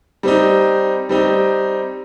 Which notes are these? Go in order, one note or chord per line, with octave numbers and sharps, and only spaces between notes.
G3 C4 D#4
G3 C4 D#4